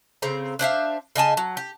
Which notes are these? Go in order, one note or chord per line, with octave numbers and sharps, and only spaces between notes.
C#3 C4 A#5
D4 C5 E5 F5
C#3 D#5 G#5 A5
F#3
G4